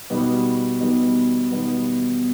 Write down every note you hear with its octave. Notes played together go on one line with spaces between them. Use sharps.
B2 G3 B3 D#4
B2 G3 B3 D#4
B2 G3 B3 D#4